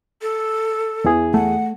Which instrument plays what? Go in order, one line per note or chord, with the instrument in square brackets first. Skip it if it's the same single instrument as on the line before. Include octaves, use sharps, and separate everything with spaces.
[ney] A4
[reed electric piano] E2 E3 G#4
[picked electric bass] A3 [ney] F#5